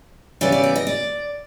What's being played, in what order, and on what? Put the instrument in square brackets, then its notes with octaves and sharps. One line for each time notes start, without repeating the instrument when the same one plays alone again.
[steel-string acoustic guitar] C#3 E3 G3 B3 D5
D5
D5
D#5
D5